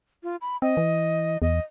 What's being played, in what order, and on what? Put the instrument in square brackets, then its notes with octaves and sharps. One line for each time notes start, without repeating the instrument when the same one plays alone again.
[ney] F4
B5
[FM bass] C4 [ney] D#5
[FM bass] E3
[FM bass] E2 [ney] D#5